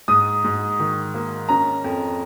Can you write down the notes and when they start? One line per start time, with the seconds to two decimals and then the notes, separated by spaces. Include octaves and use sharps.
0.08 G#2 D#6
0.44 G#2
0.79 D#3
1.14 A#3
1.49 C#4 A#5
1.84 F2